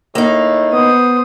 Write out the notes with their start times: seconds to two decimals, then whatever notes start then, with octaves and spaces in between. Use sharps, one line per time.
0.15 A2 A#3 D#4
0.73 B3 C5 D#6